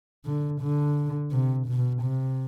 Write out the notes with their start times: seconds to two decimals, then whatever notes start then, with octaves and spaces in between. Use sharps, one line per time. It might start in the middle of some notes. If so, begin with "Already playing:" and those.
0.25 D3
0.61 D3
1.31 C3
1.68 B2
2.02 C3